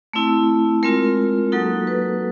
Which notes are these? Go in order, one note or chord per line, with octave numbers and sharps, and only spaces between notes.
A3 C4 E4
G#3 C4 F4 A#4
F#3 A#3 D#4 F#4 A4
B4